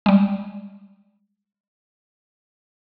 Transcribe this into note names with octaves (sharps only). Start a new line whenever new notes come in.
G3 G#3